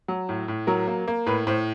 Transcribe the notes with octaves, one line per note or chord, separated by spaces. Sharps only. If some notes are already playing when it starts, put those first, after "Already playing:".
F#3
A2
A2
F#3 A#4
A#3
A#3
A2 B4
A2 C5